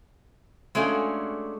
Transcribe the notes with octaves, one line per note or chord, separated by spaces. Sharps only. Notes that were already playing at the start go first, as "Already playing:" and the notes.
G#3 A3 C#4 D4 F#4 F5